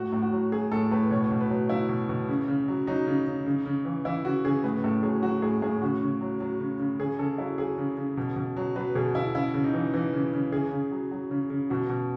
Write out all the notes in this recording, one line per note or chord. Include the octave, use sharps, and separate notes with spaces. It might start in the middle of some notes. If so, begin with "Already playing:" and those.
Already playing: A2 F#4
A2
F#4
F#3
F#3 G#4
A2 A4
A2 B4
B2 C#5
B2
B4
F#3
F#3 E4
B2
B2
C#3
C#3
F#3
F#3 D#4
C#3
C#3
C#3
C#3
E3
E3 E4
C#3 F#4
C#3 G#4
A2 B4
A2 A4
F#3 G#4
F#3 F#4
A2 G#4
A2 G#4
C#3 F#4
C#3
F#3
F#3
C#3
C#3
C#3 G#4
C#3 A4
F#3 E4
F#3 G#4
C#3
C#3
B2
B2
F#3
F#3 B4
B2 G#4
B2 E4
C#3 E4
C#3
D#4
E3
E3
C#3
C#3
C#3 G#4
C#3
F#3
F#3
C#3
C#3
B2 F#4
B2